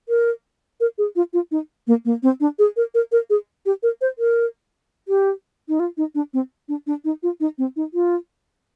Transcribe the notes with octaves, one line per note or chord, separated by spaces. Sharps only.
A#4
A#4
G#4
F4
F4
D#4
A#3
A#3
C4
D4
G#4
A#4
A#4
A#4
G#4
G4
A#4
C5
A#4
G4
D#4
F4
D#4
D4
C4
D4
D4
D#4
F4
D#4
C4
D#4
F4